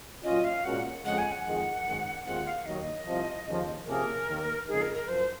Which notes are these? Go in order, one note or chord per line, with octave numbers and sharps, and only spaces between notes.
A#2 F#3 C#4 F4 D#5
F5
A#2 G#3 C#4 F#4 A#4 F#5
F2 C#3 G#3 F#5
G#5
F#5
F2 D#3 G#3
G#1 F#2 D#3 G#3
D#2 D#3 G#3 C4 F4 F#5
F5
D#2 D#3 F#3 A#3 D#4 D#5
C2 C3 F3
D#2 C#3 F3
C3 F3 A#3 C#4 G#4 A#4
D#2 D#3 A#3
F2 C#3 G#3 D#4 G#4
A#4
A#4
F#2 F3 C5